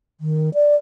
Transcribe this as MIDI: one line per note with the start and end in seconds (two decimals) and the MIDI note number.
0.21 0.50 51
0.54 0.76 74